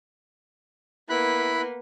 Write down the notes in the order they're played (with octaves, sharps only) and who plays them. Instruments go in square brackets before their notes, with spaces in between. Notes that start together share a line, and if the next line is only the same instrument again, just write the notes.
[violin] A#3 B3 [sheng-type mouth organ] E4 B5 F#6